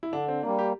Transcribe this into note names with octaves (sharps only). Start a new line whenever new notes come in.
E4
D3 D4
C4
G3 A#3 D4
G4